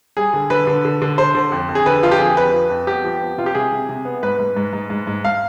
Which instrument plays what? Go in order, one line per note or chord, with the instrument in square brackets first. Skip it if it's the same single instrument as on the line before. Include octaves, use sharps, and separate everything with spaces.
[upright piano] G3 G#4
D3
D3 B4
D3
D3
D3
D3 C5
D3
F2
F2
G#4
D3 B4
F3 F4
G4
F2 G#4
F2 B4
F3
F2
B3 G4
F3
B3
C3 F4
G4
C3 G#4
C3
C3
B3
G#2 B4
G#2
G#2
G#2
G#2
G#2
F5